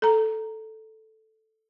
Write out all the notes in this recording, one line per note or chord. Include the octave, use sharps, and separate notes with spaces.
A4 A#5